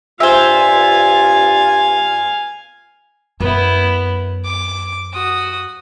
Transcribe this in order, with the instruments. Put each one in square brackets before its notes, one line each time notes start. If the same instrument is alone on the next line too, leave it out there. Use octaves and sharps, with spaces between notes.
[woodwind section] G2 F4 [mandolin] C5 E5 [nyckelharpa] F5 G#5
[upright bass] F#2 [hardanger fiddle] B3 E4
[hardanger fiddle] D6
F#4 D#6